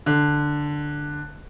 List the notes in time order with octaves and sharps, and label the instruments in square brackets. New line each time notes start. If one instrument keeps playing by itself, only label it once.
[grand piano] D3